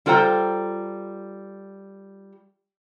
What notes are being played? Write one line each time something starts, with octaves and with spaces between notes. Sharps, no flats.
G3 F4 A4 C5 G5 A#5